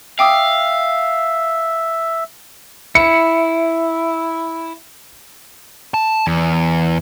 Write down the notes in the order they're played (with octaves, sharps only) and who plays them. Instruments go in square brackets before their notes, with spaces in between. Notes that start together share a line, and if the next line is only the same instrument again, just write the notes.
[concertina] E5 [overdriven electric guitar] F5 [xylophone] G5 D6 D#6
[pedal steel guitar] E4 [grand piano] C#7
[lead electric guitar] A5
E2